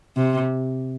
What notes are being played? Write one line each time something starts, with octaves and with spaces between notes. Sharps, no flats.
C3